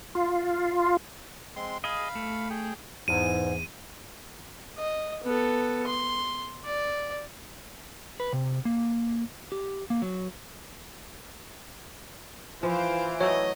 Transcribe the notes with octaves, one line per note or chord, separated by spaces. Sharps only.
F4
G#3 C4 C6
G#4 D#5 F5 B5
A3
G#4 G5
E2 G#2 D#7
D#5
B3 A4
C6
D5
B4
C3
A#3
G4
A#3
F#3
E3 F3 C5 F5 D7
F#3 A3 C#5 D#5